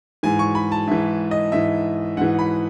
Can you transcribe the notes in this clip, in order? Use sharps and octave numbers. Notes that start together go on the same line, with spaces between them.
G#2 E3 G#5
C#6
B5
A5
G#2 E3 E5
D#5
G#2 E3 E5
G#2 E3 F#5
B5